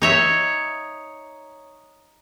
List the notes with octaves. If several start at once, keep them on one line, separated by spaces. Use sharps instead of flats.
D#4 C#5 E5